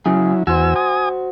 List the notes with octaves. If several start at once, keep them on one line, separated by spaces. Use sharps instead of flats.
F#2 C#3 F#3 E4 G#4
E2 F#4 C5 G#5 E6
G#5 D#6